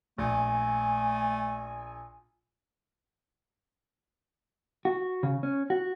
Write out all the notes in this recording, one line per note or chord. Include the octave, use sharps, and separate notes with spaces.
A#1 A3 G#5
F#4
C#3
C#4
F#4